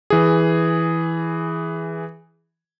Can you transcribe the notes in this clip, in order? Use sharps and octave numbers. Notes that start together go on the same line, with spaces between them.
E3 G#4